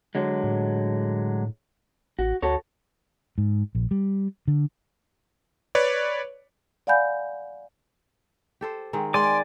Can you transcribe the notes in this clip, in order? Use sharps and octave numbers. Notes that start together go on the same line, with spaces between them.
D3 F#3 G#3
A2
A1 F#4
D2 F#4 A4 C#5
G#2
A#1
G3
D3
B4 C#5 D5
D5 F5 F#5 G#5 B5 G6
G4 A4 C5
D#3 G#3 C4
G#3 D5 G#5 C6 D6